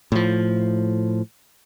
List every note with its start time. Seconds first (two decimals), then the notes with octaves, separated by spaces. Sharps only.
0.12 A2 F3